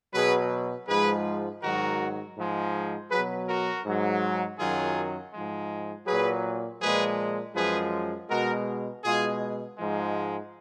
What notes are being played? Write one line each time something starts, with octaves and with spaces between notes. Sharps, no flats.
B2 F#3 G#4 B4
G#2 F3 G#3 G#4 B4
G#2 D#3 F#3 F#4 A#4
G#2 F3 G#3
B2 F#3 G#4 B4
F#4 A#4
G#2 F#3
F#2 D#3 F#3 F4 G#4
G#2 F3 G#3
A#2 F#3 G#4 B4
A#2 F3 G#3 G#4 B4
F#2 F3 G#3 G#4 B4
B2 G#3 F#4 A#4
B2 G#3 F4 G#4
G#2 F3 G#3